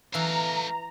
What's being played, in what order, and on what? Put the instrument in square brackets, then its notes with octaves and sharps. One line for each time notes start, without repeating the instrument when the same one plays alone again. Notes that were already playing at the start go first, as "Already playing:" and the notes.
[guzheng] E3 [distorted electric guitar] A3 F5 [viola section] A#5